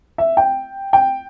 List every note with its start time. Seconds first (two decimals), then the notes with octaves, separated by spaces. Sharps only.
0.18 E5
0.37 G5
0.93 G5